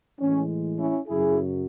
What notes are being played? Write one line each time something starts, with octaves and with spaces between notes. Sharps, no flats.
A2 E3 G#3 C#4
C#4 E4
F#2 C#3 F#3 E4 G#4